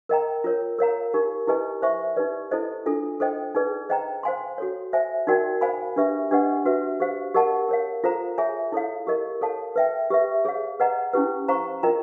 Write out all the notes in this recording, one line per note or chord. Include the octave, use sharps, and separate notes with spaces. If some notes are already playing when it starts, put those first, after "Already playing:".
A#4 D#5 G5 A#5
F4 A#4 C#5
A#4 C#5 F5 A#5
D#4 G4 A#4
E4 G4 B4 D#5 G#5
C5 E5 G#5 C#6
D#4 G4 B4 D5
E4 A4 C5 D#5
D4 F4 A4
A4 C5 D#5 G5
D#4 G#4 B4 D5
C5 D#5 G5 A#5
C5 F5 G#5 C6
F#4 A4 C#5
C5 E5 G#5
D#4 F#4 A#4 D5 G5
C5 F5 G#5 B5
D4 G4 B4 E5
D4 G4 B4 D#5 F#5
F#4 B4 E5
G4 C5 F5
G4 A#4 D#5 F#5 A5
A#4 C#5 F5
F4 A4 C5 F5 A#5
G#4 C#5 E5 G#5
E4 A4 C#5 F5
G4 A#4 D#5
A4 C#5 F5 A5
B4 E5 G5
G4 B4 E5
G#4 C#5 F5
B4 D#5 F#5 A#5
C#4 E4 G4 B4
C5 F5 A#5 C#6
F4 A#4 D#5 G5 A#5